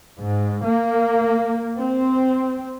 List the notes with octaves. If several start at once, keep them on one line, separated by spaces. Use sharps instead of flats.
G#2
A#3
C4